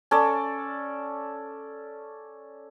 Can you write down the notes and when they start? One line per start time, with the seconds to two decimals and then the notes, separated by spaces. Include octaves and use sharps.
0.11 C#4 A4 D5